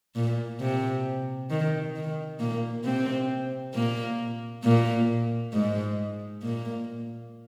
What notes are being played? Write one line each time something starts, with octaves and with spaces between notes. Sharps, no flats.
A#2
C3
D#3
D#3
A#2 A#3
C3 C4
A#2 A#3
A#2 A#3
G#2 G#3
A#2 A#3